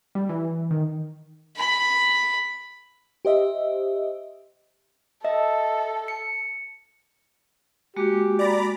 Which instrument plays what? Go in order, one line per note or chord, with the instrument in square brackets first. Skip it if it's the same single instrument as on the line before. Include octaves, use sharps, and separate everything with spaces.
[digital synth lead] G3
E3
D#3
[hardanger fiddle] B5
[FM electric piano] G4 C5 D#5 E5
[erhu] A4 [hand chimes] D#5 E5
[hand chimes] C#7
[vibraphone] G#3 A#3 F#4 [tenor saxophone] G4
[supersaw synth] D5 A#5 B5